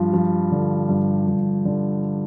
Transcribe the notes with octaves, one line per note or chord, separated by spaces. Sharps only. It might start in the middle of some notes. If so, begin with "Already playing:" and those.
Already playing: G2 F3
F3
D3
G2
G2
D3